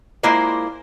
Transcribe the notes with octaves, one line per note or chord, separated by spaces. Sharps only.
G#3 A#3 E4 F4 C5 D5